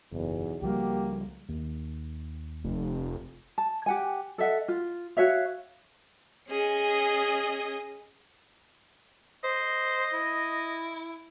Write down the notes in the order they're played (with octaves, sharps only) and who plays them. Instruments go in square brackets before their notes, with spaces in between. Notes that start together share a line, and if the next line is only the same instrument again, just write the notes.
[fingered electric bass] F#1 [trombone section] B1 E2
[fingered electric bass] C#2 F3 G3 [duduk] A#3 [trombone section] F#4 G4
[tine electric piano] D#2
[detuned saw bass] F1
[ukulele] A5
G4 F#5 G#5
A4 D#5 E5 F#5
F4
F#4 C#5 E5 F5
[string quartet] C#4 G#4 D#5 G#5
[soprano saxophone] C5 [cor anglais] D#5
[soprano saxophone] E4